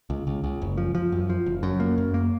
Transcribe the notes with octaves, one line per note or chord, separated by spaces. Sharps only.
C#2
C#2
C#2
F#1
F3
F3
F#2
F3
F#1
F#2
A#3
F#2
A#3